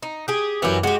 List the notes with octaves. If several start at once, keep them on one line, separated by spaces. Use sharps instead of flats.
D#4
G4 G#4
F#2 E3 F#4 G4
G#3 F#4 G4